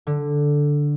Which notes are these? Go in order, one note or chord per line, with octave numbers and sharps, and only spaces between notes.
D3